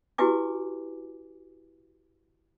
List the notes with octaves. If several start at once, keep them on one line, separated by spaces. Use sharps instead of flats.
E4 F#4 G4 B4 G#5 D6